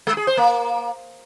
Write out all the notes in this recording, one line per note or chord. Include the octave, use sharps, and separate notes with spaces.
G#3
G#4
C5
A#3